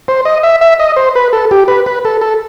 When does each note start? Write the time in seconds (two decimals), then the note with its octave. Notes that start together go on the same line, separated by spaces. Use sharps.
0.08 C5
0.25 D#5
0.43 E5
0.61 E5
0.79 D#5
0.96 C5
1.15 B4
1.33 A4
1.51 G4
1.68 B4
1.86 B4
2.05 A4
2.21 A4